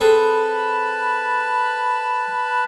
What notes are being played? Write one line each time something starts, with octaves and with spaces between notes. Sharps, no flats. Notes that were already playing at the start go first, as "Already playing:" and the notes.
C4 G#4 A4 B4 A5 B5